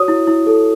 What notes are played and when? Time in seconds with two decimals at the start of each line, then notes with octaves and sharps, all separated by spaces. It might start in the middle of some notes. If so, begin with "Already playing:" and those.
Already playing: F#4 C#5 D#6
0.08 E4
0.27 E4
0.47 A4